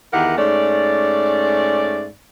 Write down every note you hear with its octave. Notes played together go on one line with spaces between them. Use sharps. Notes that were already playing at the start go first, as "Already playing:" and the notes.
E2 D#3 E4 G4 A#4 F#5
G#2 A3 C#4 D5